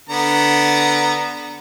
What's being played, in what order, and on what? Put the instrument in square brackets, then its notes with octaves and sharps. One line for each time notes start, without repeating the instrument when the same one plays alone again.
[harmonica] D3 B3 A#5